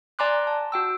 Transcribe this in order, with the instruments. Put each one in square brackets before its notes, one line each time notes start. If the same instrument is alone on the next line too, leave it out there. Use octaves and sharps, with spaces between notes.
[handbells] D5 G#5 A#5 C6 D6 F#6
A5
F#4 G5 E6